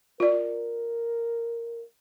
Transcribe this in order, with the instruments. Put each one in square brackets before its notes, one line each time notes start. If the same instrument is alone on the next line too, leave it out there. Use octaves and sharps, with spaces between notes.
[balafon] F4 D5 [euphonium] A#4